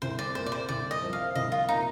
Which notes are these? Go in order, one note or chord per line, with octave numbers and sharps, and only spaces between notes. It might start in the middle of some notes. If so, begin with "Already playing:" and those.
C2 C5
D5
A#2 C5
D5
C5
C2 D5
D#5
F3
F5
C2 D#5
F4
A#2 D#4